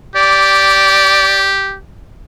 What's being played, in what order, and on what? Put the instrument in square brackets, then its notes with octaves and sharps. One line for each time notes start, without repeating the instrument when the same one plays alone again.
[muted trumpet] G4 [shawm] D5